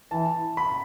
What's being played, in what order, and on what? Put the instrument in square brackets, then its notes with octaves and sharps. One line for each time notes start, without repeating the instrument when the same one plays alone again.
[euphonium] E3 [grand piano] A5
[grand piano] B5